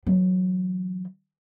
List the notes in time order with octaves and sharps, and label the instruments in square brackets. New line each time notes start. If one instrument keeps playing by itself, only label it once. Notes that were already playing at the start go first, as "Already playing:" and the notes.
[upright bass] E3 F#3